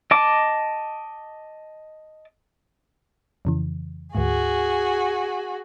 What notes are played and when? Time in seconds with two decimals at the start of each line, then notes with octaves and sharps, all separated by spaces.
0.11 D#5 A5 D6
3.45 F2 C#3 E3
4.15 D2 G#2 F#4 G#4